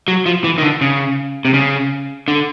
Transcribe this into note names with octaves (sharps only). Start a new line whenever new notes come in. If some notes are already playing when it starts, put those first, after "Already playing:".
F#3
F3
E3
D#3
D3
C#3
C3
C#3
D3